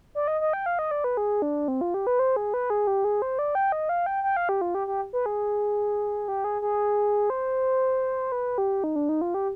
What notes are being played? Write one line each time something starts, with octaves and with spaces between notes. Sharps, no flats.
D5
D#5
D#5
G5
F5
D#5
D5
B4
G#4
D4
C4
F4
G4
B4
C5
G#4
B4
G#4
G4
G#4
C5
D5
G5
D#5
F5
G5
G5
F5
G4
F4
G4
G4
B4
G#4
G4
G#4
G#4
C5
B4
G4
D#4
D4
D#4
F4
G4